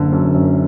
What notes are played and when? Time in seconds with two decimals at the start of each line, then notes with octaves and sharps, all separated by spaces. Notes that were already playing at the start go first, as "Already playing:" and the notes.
Already playing: F#1 D3
0.12 F#2
0.34 F#2